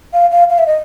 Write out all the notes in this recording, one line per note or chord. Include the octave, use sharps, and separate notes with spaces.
F5
F5
F5
E5
D#5